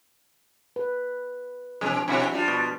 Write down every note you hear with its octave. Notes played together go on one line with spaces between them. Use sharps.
B4
B2 E3 F3 G#3
B2 G3 C4 C#4 E4 F#4
G3 D4 F4
B2